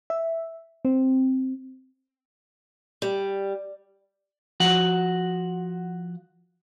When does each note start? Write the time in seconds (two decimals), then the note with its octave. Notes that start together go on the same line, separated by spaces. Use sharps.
0.10 E5
0.85 C4
3.02 G3
4.60 F3 F#4 F#5